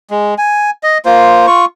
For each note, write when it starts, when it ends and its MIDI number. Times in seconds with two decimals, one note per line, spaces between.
0.11 0.34 56
0.38 0.70 80
0.83 0.98 75
1.06 1.46 58
1.06 1.46 65
1.06 1.46 72
1.47 1.65 65
1.47 1.65 85